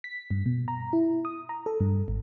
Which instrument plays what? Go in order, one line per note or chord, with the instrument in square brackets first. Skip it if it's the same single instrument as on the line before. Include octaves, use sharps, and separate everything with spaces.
[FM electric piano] B6
G2
B2
A#5
E4
D#6
A#5
A4
G2
G#1